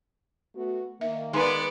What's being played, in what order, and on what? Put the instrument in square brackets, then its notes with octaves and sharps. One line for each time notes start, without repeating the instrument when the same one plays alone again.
[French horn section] A3 B3 F#4
[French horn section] D#3 A#3 [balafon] E5
[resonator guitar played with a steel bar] G#3 B4 [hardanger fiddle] B3 D5 [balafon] D#4